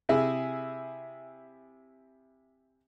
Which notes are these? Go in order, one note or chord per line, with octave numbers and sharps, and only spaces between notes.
C3 E4 G#4